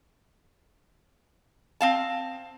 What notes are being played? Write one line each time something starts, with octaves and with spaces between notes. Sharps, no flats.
C4 F5 A5